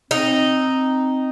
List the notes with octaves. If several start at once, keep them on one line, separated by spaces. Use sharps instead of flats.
C4 D#4